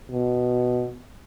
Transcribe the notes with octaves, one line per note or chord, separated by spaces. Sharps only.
B2